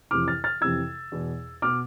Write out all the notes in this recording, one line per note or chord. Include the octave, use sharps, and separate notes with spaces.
F2 C3 E3 D6 F6
F6 A6
F6 A6
F2 C3 E3 E6 G#6
E2 B2
B2 D6 F6